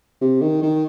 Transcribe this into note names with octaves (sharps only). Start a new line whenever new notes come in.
C3
D#3
D#3